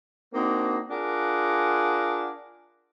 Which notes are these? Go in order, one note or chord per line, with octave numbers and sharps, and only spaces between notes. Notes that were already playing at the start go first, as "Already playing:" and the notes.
A#3 C4 D4 D#4 F#4
D4 F4 G#4 A#4 F#5 G#5